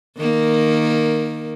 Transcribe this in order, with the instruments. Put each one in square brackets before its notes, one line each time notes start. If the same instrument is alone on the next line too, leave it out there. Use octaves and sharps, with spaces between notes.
[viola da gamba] D#3 A#3